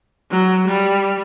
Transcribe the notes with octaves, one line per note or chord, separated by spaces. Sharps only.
F#3
G3